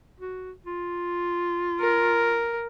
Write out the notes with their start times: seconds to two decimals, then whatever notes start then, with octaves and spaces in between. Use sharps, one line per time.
0.20 F#4
0.66 F4
1.80 A#4